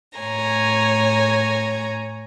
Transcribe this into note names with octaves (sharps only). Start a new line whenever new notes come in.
A2 C#5 G#5 A#5